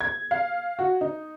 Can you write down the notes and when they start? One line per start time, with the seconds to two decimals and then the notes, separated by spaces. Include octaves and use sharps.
0.01 G#6
0.31 F5
0.79 F#4
1.01 D#4